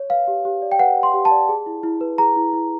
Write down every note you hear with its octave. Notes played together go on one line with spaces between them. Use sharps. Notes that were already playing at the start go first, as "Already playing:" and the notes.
Already playing: C#5
B4 F5
G4
G4
D5
G5
B4 F#5
G4
C6
G4
A5
D5
G#4
E4
E4
B4
G#4 A#5
E4
E4